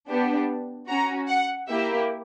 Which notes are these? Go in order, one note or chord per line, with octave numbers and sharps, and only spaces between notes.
B3 D4 G4
C#4 F#4 A#5
F#5
A#3 E4 G4 E5